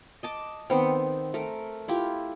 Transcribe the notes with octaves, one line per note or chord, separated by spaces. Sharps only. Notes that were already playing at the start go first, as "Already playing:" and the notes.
D#5 A5 D6
D#3 B3 C4
A3 A#4
E4 F4 G4